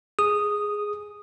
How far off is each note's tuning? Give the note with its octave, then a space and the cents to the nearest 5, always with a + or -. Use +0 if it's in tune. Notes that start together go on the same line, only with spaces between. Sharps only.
G#4 +0 D#6 -5